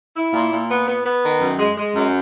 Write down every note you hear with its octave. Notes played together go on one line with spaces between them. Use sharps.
E4
A#2
A#2
B3
B3
B3
D#3
F#2
G#3
G#3
F#2